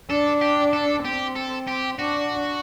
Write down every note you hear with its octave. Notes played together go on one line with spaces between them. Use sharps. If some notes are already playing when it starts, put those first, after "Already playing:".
D4 A4
G4
A4
C4 G4
A4
G4
D4 F#4